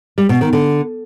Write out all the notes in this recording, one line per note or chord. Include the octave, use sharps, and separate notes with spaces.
G3
B2
D#3
D3